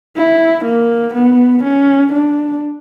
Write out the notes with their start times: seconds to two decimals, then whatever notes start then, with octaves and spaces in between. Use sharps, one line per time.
0.16 E4
0.65 A#3
1.14 B3
1.63 C#4
2.12 D4